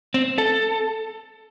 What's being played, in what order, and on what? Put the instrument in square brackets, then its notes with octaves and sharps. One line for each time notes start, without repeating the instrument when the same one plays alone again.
[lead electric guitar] C4
A4